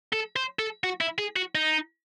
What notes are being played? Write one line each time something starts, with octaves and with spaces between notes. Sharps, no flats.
A4
C5
A4
F#4
E4
G#4
F#4
D#4